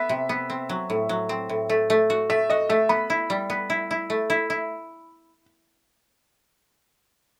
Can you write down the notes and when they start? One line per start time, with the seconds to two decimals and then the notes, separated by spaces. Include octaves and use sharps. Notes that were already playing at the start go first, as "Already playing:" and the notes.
Already playing: B3 E5
0.09 C3
0.29 B3
0.50 C4
0.69 F#3
0.90 A2
1.09 F#3
1.29 C4
1.49 A2
1.70 A3
1.90 A3
2.10 F#4
2.30 A3 E5
2.50 F#4 D#5
2.69 A3 E5
2.89 B3 B5
3.10 E4
3.30 G3
3.50 B3
3.70 E4
3.91 E4
4.10 A3
4.30 E4
4.50 E4